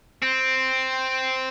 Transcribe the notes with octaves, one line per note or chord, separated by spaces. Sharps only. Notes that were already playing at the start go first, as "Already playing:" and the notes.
C4